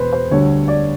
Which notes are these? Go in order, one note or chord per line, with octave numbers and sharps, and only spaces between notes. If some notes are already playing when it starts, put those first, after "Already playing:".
Already playing: E1 E2 B2 B4 C5
C5
D2 D3 G3 C#5
D5